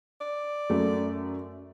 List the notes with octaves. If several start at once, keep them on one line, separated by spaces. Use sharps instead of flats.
D5
F#2 A3